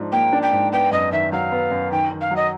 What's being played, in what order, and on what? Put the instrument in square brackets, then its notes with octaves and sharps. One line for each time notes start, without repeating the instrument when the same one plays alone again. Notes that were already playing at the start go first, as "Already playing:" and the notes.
Already playing: [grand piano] G#2 F3 D4
[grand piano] A#3 [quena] G5
[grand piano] D4
[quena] G5
[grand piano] G#2
[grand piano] B3 [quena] G5
[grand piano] F#2 [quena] D#5
[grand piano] D#3 [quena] E5
[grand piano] F#3 [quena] F5
[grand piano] B3
F#2
[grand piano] D#3 [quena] G5
[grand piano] D#3
[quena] F5
[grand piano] F#3
[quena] D#5